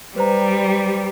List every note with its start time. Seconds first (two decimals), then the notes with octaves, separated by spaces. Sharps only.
0.16 G3 B4 C5 A#5